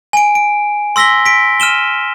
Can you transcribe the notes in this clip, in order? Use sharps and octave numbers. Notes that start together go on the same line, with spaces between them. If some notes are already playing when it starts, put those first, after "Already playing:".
G#5 D7
D7
C6 E6 A#6 B6 G7
B6 D7
F6 D#7 E7 G7